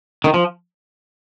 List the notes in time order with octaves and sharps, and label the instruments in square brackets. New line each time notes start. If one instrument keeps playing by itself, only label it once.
[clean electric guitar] D#3
F3